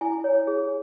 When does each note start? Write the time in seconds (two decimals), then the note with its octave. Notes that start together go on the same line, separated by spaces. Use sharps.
0.01 E4 G#5
0.24 C#5
0.47 G#4